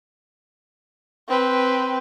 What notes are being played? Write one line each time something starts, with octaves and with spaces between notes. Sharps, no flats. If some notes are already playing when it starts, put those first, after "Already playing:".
C4 B4